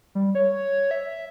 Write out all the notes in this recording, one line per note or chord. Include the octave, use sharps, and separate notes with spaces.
G3
C#5
E5